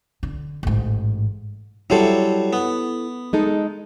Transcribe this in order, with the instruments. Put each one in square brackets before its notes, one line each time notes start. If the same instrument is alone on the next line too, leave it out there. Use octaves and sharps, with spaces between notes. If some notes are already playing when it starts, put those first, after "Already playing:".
[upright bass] D3
A1 G#2
[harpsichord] F#3 G3 C5 [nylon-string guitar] E4 A4
[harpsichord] B3
[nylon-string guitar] G#3 D#4 A4